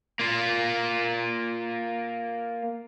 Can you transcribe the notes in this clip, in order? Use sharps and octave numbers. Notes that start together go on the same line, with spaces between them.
A#3 F4